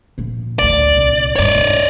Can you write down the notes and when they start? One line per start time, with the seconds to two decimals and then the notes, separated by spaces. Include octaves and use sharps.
0.18 A#2 F3
0.59 A1 D2 D5
0.96 C2 A#2
1.36 A1 G2 C#5 D5
1.54 E1 G#2